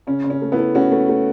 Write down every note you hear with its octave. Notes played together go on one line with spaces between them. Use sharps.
C#3 C#4
C#3
C#4
A3
B3 E4
A3
A3 C#4 F#4
A3
A3